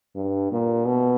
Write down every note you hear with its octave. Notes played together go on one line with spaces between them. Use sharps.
G2
A#2
B2